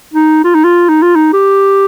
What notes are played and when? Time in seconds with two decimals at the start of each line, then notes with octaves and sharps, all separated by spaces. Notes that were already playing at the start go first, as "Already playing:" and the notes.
0.14 D#4
0.44 F4
0.55 D#4
0.64 F4
0.89 D#4
1.02 F4
1.16 D#4
1.33 G4